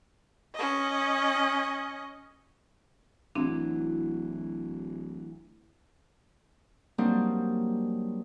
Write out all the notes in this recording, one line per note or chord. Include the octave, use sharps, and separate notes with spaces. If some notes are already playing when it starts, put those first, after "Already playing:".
C#4 D#5
D1 E3 F#3 C4 D4 E4
F#3 G3 A#3 C4 D4 D#4